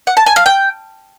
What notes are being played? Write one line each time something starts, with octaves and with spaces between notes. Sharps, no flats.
F#5
A5
G#5
F5
G5